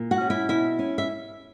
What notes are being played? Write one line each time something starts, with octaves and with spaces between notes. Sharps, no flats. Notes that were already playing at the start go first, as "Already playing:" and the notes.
Already playing: A#2
F#4 F#5
C#4
E4 E5
B2 E4 E5
C#4
E5